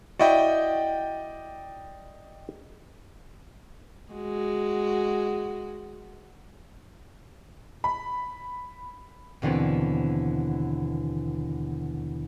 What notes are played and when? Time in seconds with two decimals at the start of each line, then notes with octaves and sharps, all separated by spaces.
0.19 E4 F#4 D5 D#5 G5
4.13 G#3 F#4
7.84 B5
9.42 D#2 B2 D3 E3 C4